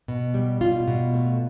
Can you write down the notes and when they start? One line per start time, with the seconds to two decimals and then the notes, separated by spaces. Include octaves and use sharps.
0.08 B2
0.34 G3
0.61 B2 F4
0.88 B2
1.14 A3